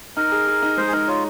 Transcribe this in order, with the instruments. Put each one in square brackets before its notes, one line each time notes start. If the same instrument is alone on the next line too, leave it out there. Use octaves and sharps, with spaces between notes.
[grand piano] D#4 [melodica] A#4
[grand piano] G#4
G#4
D#4
[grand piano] G#3 [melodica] C5
[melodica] G#4
[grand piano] D#4 [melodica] A#4
[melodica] F4 [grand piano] C#5